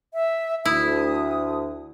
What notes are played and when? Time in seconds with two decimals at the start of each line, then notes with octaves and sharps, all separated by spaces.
0.14 E5
0.65 D2 E4 D#6